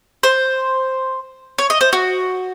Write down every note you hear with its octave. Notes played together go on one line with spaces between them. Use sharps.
C5
C#5
D#5
C5
F#4